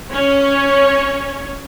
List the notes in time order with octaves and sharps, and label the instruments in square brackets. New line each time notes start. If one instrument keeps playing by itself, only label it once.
[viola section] C#4 C#5